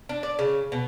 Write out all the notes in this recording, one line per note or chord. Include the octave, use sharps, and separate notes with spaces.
D4
D5
C#3
B2